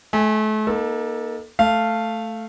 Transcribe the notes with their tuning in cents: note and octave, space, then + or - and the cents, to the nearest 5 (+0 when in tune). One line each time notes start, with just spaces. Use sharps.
A3 -35 G#5 -10
A#3 +35 D#4 +10 A4 +0
A3 +0 F5 -10